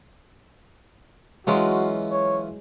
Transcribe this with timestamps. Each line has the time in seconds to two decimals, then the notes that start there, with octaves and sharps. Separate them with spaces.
1.47 E3 F#3 G#3 C#4 F4 F#4
2.10 C#5